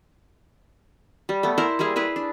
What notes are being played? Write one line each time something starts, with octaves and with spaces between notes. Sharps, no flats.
G3
A3 B3
E4 A#4 C5
G3 A#3 E4 G#4
E4 G#4 B4
D4